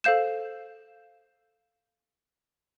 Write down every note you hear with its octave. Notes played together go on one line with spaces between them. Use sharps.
A4 C5 F5 G6 E7